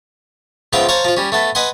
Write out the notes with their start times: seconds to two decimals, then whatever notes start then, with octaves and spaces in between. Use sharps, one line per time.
0.73 C#2 F3 B3 F4 E5 G5
0.89 C5 C#5 F5 A5 A#5 C#6
1.05 F3 F4
1.17 G3 C#4
1.32 A3 B3 A4
1.55 B4 D#5 F#5 G#5 C6